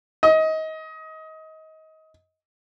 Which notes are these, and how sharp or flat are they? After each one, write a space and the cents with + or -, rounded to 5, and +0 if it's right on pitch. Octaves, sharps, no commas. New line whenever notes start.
D#5 +25